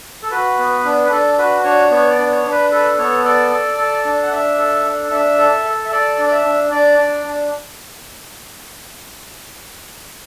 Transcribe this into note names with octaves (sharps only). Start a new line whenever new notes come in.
A4
F#4 B4
B3
D4
B4
D4 A4
F#4 B4
D4 C#5
B3 C#5
D5
D4
C#5
D4
B4
A4 B4
B3 C#5
A4 D5
A4
A4
D4
F#5
D4 E5
A4
D4
D4 E5
A4
A4
E5
A4 D5
D4
D5
E5
D4
D4 D5
D4
D4